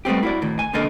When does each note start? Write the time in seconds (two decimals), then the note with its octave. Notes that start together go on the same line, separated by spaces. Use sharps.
0.05 G3 A3 B3 C4 G4
0.23 E4 F#4 D5
0.42 A2 D#3
0.59 G#5
0.73 B1 D3 A#3 A4 A#4 D#5